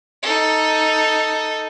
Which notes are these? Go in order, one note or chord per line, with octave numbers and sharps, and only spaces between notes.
D#4 A4